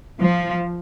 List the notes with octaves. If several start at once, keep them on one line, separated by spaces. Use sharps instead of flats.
F3